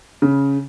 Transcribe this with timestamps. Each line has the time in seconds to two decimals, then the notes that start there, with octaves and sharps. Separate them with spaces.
0.22 C#3